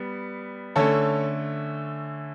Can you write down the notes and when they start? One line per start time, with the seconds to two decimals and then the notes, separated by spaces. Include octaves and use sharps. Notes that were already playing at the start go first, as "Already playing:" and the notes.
Already playing: G3 B3
0.76 D3 A3 C#4 A4 C#5